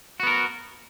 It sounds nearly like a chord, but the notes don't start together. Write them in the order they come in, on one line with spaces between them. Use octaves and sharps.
F#4 B3 A#4